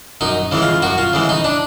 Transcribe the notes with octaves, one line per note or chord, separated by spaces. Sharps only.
F#2 D#4
C#3 E3 G#3
F4
F#2 F#4
F4
C#3 E3 G#3
D#4
D4